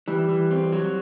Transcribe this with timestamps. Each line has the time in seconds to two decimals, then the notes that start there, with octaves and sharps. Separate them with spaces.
0.08 E3 G3
0.29 E3
0.51 C4
0.72 F#3